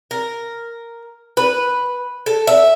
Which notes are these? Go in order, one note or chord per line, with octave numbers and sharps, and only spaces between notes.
A#4
B4
A4
E5